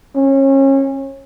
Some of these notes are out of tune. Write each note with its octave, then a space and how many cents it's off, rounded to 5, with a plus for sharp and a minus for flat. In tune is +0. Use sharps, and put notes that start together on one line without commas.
C#4 -30